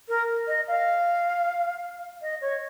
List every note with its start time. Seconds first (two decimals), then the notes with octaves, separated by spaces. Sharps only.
0.09 A#4
0.48 D#5
0.68 F5
2.22 D#5
2.41 C#5